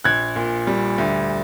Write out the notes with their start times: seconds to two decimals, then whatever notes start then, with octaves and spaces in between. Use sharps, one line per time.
0.04 A#1 F#6 G#6
0.36 A#2
0.67 G3
0.98 D2